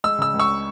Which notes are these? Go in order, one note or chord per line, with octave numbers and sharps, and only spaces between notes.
G#3 E6
C#3 E6
C#2
C#6 E6